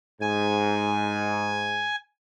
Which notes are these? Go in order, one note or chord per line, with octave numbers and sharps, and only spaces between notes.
G#2 G#5